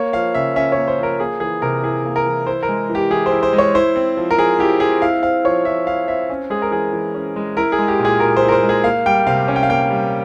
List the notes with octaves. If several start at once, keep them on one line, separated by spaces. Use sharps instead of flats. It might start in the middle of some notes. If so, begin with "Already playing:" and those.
Already playing: A#3 C#5
F3 F5
C#3 E5
C#4 E5
A#3 C#5
C5
F3
A#4
A#3 G#4
E3 G#4
C3 A#4
E4 G#4
A#3
A#4
E3
E4 C5
A#4
G#3
E3
G4
E3 G#4
C5
E4
C5
G#3
C#5
E4 C5
C4
F3
A#4
F3 G#4
E4 G4
C4 G#4
E4 F5
C4 F5
F3 C#5
F3 E5
E4 F5
C4 E5
C#4
G#3 G#4
A#4
E3 G#4
E3
C#4
G#3
E4 A#4
G#4
G#3
G4
A#2
G#4
A#2 A#4
E4 C5
A#4
C5
G#3
G#4
A#3 F5
G3 G5
C3 F5
C#4
G5
F5
A#3 G5
G3